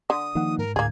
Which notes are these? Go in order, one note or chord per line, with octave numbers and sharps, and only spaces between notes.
D3 D#6
D#3 F3 A#3 D#4 F#5
G#2 A#4
D2 A2 A#3 G#4 G#6